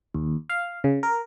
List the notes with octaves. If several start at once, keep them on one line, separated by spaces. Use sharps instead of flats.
D#2
F5
C#3
A#4